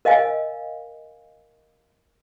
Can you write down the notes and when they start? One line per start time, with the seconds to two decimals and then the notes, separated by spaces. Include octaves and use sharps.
0.05 A#4 D#5 F5 G#5